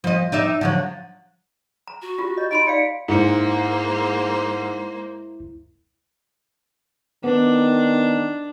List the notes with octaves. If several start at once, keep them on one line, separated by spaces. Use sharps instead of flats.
F3 D#5
D#4 D5 E5
D3 F3 F#3
A#5
F#4
F4 G4
D#5 G6
D#4 D#5 B5 C6 D7
D5 F5 C#7
G#2 G#3 A#3 E4 C5 C#7
D#3 B3 D4